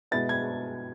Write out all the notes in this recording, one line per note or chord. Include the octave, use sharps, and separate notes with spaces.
B2 G#3 B3 E4 A6
G#6